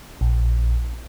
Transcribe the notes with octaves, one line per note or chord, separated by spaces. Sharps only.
A#1